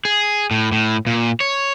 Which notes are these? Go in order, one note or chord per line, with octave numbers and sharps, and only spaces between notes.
G#4
A2
A2
A#2
C#5